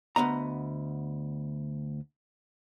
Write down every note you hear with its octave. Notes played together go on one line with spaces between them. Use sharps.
D2 B3 D#5 A#5